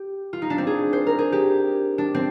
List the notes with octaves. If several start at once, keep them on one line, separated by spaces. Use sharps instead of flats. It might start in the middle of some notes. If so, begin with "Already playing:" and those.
Already playing: G4
F4
D#4
D4
C4
G#4
C5
A#4
G#4
G4
D4
C4